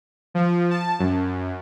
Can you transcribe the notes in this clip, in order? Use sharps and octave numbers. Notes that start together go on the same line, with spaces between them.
F3
A5
F#2